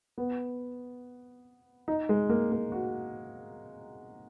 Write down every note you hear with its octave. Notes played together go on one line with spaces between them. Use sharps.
B3
D#4
G#3
A#3
A#3
F#4